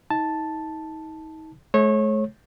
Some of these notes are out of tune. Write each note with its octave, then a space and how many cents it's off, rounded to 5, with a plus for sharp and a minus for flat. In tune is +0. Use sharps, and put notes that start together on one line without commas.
D#4 +35 A5 +0
A3 -45 C#5 -25